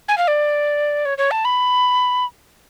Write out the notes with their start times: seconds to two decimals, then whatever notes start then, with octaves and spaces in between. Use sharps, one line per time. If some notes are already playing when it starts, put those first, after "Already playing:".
0.08 G#5
0.18 F5
0.28 D5
1.05 C#5
1.18 C#5
1.31 A5
1.45 B5